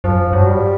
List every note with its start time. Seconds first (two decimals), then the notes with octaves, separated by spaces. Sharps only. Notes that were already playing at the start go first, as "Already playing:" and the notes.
0.04 F#2 F3
0.33 G2 F#3
0.47 G3